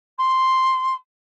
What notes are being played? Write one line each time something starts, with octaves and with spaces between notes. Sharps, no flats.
C6